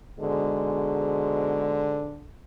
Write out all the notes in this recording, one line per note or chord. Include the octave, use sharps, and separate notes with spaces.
G#2 B2 D3 G#3